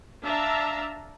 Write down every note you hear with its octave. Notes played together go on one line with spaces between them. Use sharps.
D4 E5 F5 A5 A#5